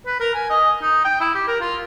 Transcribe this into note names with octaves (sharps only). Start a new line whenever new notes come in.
B4
A#4
G#5
D#5
D#4
G5
E4
G4
A#4
F4